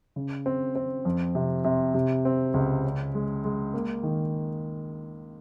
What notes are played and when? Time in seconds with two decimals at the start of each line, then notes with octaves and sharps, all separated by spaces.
0.16 C#3
0.46 C4
0.75 C4
1.05 F2
1.35 C3
1.64 C3
1.94 C3
2.25 C4
2.54 C#2
2.84 C#4
3.15 G#3
3.44 G#3
3.74 A#3
4.03 D#3